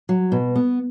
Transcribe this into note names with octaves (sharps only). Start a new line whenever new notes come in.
F#3
B2
B3